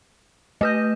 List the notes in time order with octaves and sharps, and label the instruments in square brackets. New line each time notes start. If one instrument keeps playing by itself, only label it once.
[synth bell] A3 B4 G6 [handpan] D#5